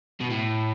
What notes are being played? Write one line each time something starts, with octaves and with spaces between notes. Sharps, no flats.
B2
A2